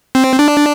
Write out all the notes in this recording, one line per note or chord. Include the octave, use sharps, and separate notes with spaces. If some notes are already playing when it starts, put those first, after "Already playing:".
C4
D4